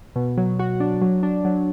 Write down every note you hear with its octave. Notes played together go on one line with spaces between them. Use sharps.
B2
F#3
F#4
D4
F#3
D4
F#3